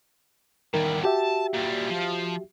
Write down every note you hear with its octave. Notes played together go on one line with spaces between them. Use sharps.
E2 D#3 G3 A#4
F#4 G4 E5 A5
A#2 G3
F3